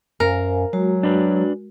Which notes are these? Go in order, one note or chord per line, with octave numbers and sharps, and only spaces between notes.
F#2 A#4 C5 F5 G#5
F#3 G#3 F#4
D4 B4